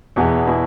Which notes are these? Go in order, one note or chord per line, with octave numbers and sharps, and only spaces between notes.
E2 B2 B3 E4 G#4
B2 B3 E4 G#4